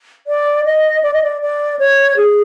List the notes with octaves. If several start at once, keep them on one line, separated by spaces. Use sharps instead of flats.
D5
D#5
D5
D#5
D5
D5
C#5
G#4